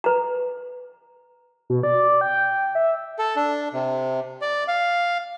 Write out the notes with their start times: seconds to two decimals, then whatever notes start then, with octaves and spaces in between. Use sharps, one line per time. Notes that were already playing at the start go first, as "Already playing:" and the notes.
0.04 B4 A#5
1.70 B2
1.83 D5
2.21 G5
2.75 E5
3.19 A4
3.36 D4
3.73 C3
4.42 D5
4.68 F5